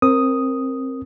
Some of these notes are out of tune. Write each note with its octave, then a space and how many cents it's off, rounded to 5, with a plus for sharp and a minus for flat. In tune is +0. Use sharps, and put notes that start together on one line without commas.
C4 +20 A#4 +0 D#6 +0